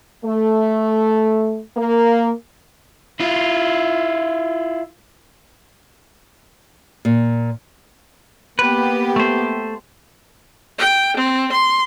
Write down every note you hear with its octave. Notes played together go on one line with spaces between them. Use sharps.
A3
A#3
E4 F4
A#2
A#3 B3 G4 B4
A3 C5
G5
C4
C6